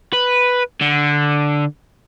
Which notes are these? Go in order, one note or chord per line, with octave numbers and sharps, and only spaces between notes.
B4
D3